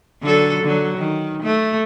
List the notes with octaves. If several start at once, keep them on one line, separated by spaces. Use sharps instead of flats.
D3 F#3 A4
D3 F#3
D#3
A3